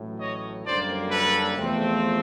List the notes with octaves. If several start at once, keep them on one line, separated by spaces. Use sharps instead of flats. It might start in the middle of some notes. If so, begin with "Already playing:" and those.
Already playing: A1 A2 F#3
C#5 D#5
F#1 F#2 D3 G3 A#3 C5 D5
A4 B4
E2 C3 F3 A3 C4